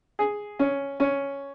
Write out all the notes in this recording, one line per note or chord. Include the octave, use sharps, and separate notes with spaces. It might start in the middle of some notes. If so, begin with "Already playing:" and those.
G#4
C#4
C#4